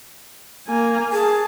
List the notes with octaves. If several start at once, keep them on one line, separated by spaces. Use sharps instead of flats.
A#3 G#5
G#4 A5